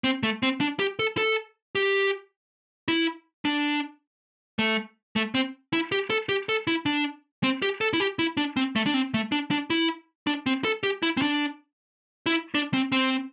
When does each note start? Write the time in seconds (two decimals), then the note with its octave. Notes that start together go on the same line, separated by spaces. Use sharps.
0.04 C4
0.23 A3
0.43 C4
0.61 D4
0.79 G4
0.99 A4
1.17 A4
1.75 G4
2.88 E4
3.45 D4
4.59 A3
5.16 A3
5.35 C4
5.73 E4
5.92 G4
6.10 A4
6.29 G4
6.49 A4
6.67 E4
6.86 D4
7.44 C4
7.62 G4
7.81 A4
7.93 E4
8.00 G4
8.19 E4
8.37 D4
8.57 C4
8.76 A3
8.86 D4
8.94 C4
9.14 A3
9.32 D4
9.51 D4
9.70 E4
10.27 D4
10.46 C4
10.64 A4
10.83 G4
11.03 E4
11.17 C4
11.22 D4
12.26 E4
12.55 D4
12.74 C4
12.92 C4